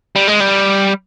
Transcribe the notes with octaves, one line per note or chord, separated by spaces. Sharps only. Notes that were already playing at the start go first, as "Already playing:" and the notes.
G3
G#3
G3